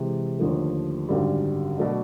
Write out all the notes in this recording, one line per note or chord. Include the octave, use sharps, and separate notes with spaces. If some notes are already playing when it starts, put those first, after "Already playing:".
Already playing: C3 E3 G#3
D#2 D3 F3 A3
G#1 F#2 D3 G3
B2 F#3 A3 D4